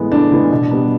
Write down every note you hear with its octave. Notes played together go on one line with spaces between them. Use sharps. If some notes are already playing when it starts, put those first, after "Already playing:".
Already playing: A2 E3 G#3 B3
A2 D4
E3 G#3 B3
B2
G3 B3